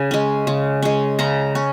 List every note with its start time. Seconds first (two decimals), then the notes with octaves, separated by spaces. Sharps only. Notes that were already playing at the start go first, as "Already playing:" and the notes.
Already playing: C#3 G#5
0.11 G#3 C#4
0.47 C#3
0.83 G#3 C#4
1.19 C#3 A#5
1.55 C#4